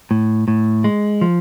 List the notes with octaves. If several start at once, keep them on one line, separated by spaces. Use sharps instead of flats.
A2
A2
G#3
F3